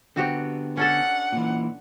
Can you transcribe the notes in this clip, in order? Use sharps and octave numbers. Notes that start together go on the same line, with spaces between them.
D3 B3 C4 F#4 G4
C#4 D4 A4 F#5
A#2 E3